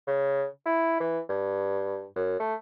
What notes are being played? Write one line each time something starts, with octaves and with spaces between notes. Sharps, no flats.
C#3
E4
E3
G2
F#2
A3